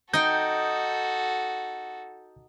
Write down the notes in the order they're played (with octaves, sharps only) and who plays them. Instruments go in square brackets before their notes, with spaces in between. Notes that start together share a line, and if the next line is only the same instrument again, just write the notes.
[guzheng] D#4 G5 [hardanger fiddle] F#4 A4 [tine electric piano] G6